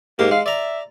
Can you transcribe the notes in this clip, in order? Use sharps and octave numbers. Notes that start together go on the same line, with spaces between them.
G#2 A#3 G4
G#3 F5
D5 E5 A#5